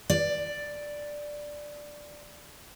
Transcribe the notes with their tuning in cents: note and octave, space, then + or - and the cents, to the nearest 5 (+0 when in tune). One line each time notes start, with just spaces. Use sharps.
D5 +5